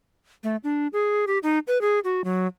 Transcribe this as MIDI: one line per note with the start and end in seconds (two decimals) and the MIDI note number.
0.44 0.56 57
0.64 0.87 62
0.93 1.25 68
1.27 1.38 67
1.43 1.59 63
1.68 1.81 71
1.81 1.99 68
2.04 2.24 66
2.24 2.47 54